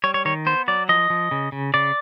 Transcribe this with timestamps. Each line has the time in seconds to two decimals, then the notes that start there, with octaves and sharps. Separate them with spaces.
0.04 G3 C#5
0.14 C#5
0.25 D#3 C#5
0.46 B3 C5
0.68 F#3 D5
0.89 F3 D#5
1.10 F3
1.31 C#3
1.52 C#3
1.74 C#3 D5